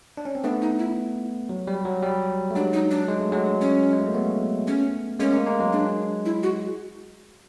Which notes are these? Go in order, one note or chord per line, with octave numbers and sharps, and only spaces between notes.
D4
C#4
C4
A3 B3 D4
D#4
E4
F#3
G3
F#3
G3
A3
F#3 G#3 D4
D#4
D4
G#3
A3
F#3 G#3
C#4
G#3
A3
A#3
A3 B3
C#4
G#3 A#3 C#4
G#3 A#3
G#3 A#3
F#3 G#3
D4
E4
F#4